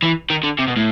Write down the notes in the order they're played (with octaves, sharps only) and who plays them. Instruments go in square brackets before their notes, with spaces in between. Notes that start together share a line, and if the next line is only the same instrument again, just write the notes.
[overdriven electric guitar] E3
D#3
D3
C3
B2
A2